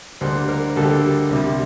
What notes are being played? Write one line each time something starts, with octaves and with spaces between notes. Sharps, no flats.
D2 D3 G3 A#3 C5
A#4
D2 D3 G3 A#3 A4
G4
A4
C2 C3 G3